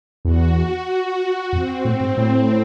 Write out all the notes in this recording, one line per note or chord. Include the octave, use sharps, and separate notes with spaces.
E2 F#4
F2 C4
A2
G#2
A2 C4